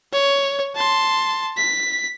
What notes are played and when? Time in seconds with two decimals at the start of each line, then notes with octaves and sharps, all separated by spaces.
0.13 C#5
0.75 A5 C6
1.57 B6